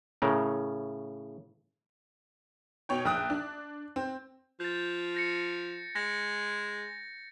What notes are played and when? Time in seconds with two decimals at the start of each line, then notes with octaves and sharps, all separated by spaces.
0.22 A2 C#3 A#4
2.89 B2 C#5 G5
3.05 A#1 G5 D#6 F#6
3.30 D4
3.96 C4
4.60 F3 G6 A6
5.15 G6 A#6 C#7
5.96 G#3 A#6